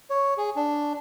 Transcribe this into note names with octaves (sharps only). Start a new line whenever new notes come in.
C#5
G#4
D4